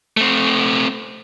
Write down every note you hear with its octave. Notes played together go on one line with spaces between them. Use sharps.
A3 C4